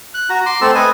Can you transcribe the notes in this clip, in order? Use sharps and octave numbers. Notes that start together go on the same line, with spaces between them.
F#6
F#4 A#5
C6 D6
A3 C4 A4 E6
B4 D#5 G#5